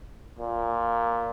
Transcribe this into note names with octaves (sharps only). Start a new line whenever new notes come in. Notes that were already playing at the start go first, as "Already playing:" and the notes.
A#2